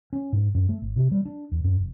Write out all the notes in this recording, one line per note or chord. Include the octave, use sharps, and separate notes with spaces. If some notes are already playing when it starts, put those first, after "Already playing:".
C#4
G#2
F#2
A3
G#1
C3
G3
D4
E2
F#2
F1